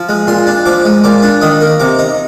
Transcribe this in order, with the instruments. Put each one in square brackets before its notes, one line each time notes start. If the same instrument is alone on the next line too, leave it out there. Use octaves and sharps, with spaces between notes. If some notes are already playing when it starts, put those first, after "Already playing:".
Already playing: [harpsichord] F3
G#3
A#2 C6
D4
F3 D6
G#3
A#2 D6
D4
D#3 D#6
A#3
C3 D6
D#4